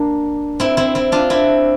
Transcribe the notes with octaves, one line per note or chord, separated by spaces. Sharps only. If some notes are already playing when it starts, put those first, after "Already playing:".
Already playing: A#3 D4
C4 E4
C4 E4
C4 E4
D4 F4
C4 E4